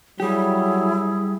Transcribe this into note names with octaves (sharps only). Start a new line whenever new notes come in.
F#3 G3 E4 G4 G#4